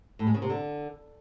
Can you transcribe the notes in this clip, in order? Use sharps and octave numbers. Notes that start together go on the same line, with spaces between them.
A2
G#3
C#3
C3
D3